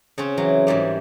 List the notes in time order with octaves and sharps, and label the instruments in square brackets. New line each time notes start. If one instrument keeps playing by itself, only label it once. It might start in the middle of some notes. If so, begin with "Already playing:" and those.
[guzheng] C#3 C4 C#4
E3 F#3
G#2 E3 G3 A#3